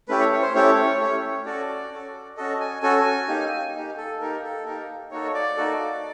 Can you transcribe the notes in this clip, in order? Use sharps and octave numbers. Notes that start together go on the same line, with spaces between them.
A3 C#4 E4 G4 B4
C#5
C#5
C5
A3 C#4 E4 G4 C#5
A3 C#4 E4 G4
C#4 F#4 A4 D5
C#4 F#4 A4
C#4 F#4 A4 D#5
G#5
C#4 F#4 A4 G#5
A#3 D#4 G4
A#3 D#4 G4
A4
A#3 D#4 G4 A#4
A4
A#3 D#4 G4 A#4
A#3 D#4 F#4 A4 C#5
D5
A#3 D#4 F#4 A4